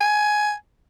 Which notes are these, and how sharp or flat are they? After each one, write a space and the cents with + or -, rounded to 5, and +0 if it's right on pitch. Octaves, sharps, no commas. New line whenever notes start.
G#5 +15